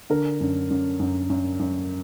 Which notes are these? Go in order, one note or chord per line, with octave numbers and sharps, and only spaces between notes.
D3 A#4
F#2
F#2
F#2
F#2
F#2